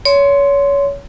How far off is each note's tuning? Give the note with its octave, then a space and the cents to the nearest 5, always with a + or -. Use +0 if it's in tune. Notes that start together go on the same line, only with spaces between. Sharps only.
C#5 +25 C6 -5